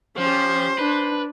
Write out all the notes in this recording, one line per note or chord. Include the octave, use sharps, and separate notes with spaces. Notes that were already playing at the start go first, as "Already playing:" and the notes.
F3 C#4 G4 C5
D4 B4